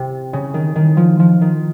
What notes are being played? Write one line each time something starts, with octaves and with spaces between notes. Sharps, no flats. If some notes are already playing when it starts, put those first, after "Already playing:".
Already playing: C3
C#3
D#3
D#3
F3
F3
D#3